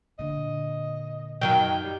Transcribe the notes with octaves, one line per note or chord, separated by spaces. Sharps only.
A#2 D3 D#5
F#2 D#3 F#3 G5
G3